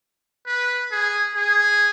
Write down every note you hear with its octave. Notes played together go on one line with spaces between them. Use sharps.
B4
G#4
G#4